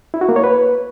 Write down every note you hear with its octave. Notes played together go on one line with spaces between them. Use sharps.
E4
F#4
A#3
C#5
B4